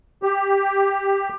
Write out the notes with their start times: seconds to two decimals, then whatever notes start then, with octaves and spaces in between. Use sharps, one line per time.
0.23 G4